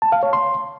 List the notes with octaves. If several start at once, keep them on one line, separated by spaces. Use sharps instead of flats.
A5
F5
C#5
C6